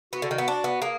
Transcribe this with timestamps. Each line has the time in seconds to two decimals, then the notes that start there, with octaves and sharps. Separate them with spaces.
0.13 B3 F#4
0.22 D3
0.31 D#3
0.38 B3
0.48 D4
0.64 B3
0.82 A#3 G#4